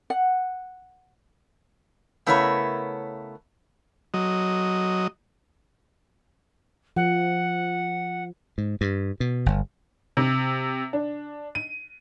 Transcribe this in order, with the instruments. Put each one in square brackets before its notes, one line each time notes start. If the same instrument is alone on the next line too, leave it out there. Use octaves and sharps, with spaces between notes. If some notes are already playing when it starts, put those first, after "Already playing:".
[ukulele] F#5
[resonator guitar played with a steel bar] C#3 A3 B3 E4 A#4 C#5
[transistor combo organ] F#3 D#5
[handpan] F3 [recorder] F#5
[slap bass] G#2
G2
B2
G1
[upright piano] C3
D4
D#7